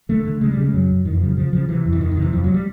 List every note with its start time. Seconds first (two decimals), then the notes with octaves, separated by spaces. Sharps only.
0.09 D3 A3
0.25 D3
0.41 C#3 G#3
0.51 G3
0.57 C#3 G#3
0.73 F#2 F#3
0.89 F#2
1.05 F2 D#3
1.13 E3
1.21 C#3 F3
1.29 F#3
1.37 C#3 F3
1.53 C#3 F3
1.69 C3 E3
1.85 F2
1.93 E3
2.00 F2 D#3
2.12 D#3
2.17 C3
2.22 E3
2.33 F2 F3
2.44 F#3
2.54 G3